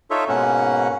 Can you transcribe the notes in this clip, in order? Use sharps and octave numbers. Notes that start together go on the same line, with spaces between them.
D#4 F4 A4 C#5 E5
G#2 B2 A#3 C#4 F#5